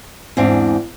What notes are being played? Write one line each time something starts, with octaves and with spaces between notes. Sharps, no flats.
E2 G#2 C4 D4